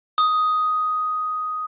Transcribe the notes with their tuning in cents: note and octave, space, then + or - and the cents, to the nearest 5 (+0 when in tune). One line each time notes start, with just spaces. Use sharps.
D#6 +5